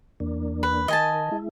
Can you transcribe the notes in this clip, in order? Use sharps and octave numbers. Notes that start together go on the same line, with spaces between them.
E2 A#3 D4
B4
D#3 A#4 D#5 G#5 A5
G#3 E4